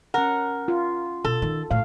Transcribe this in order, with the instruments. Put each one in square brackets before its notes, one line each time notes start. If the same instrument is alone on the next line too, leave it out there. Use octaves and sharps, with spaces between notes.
[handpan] C#4 F#5 [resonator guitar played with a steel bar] A#4
[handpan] F4
[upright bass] B2 [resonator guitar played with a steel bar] A4
[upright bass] D#3
[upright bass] A2 [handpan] F5